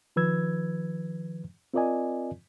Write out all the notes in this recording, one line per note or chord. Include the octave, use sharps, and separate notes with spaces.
D#3 F3 B4 E6 G#6
C4 F4 A#4 D5 D#5 G#5